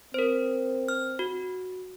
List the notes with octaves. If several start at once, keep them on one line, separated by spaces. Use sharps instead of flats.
C4 A#4 C5
F6
F#4